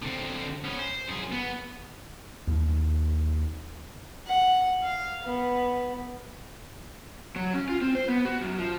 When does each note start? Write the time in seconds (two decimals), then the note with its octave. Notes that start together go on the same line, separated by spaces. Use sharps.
0.02 D3 C4
0.64 B3 C#4
0.79 C5
1.08 F#2 G#4
1.32 B3
2.47 D#2
4.26 F#5
4.83 F5
5.24 B3
7.36 F#3
7.53 C#4
7.69 F4
7.81 C4
7.95 C5
8.08 B3
8.25 F#4
8.41 F#2
8.58 F3